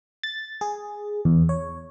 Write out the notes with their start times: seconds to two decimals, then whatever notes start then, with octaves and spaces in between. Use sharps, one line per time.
0.23 A6
0.61 G#4
1.25 E2
1.49 C#5